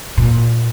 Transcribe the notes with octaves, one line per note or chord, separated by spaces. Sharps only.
A#2